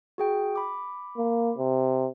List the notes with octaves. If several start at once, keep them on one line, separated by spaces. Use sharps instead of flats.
F#4 G#4 G5
B5 D6
A#3
C3